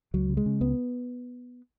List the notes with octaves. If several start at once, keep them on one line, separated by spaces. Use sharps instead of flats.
C#2 F#3
C#3
G#3
C#3
C#2 B3